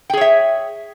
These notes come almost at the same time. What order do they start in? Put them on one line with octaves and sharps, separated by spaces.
G5 G#4 C#5 E5